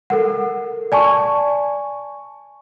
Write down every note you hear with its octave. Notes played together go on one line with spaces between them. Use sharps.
A4 A#4 F#5
D5 G#5 A5 C#6